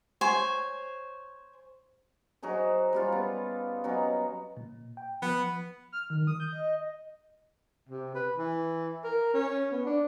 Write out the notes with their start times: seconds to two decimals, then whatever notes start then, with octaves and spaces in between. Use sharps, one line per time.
0.21 C5 C#5 G#5
2.42 F#3 D#4 G#4 C5
2.93 G3 C#4 F4
3.12 B3
3.84 F#3 B3 C#4 D#4
4.57 A#2
4.97 G5
5.22 F3 B3
5.92 F6
6.10 D#3
6.27 D#6
6.40 G6
6.52 D#5
7.89 C3
8.15 B4
8.38 E3
9.04 A#4
9.34 C#4
9.72 B3
9.86 D4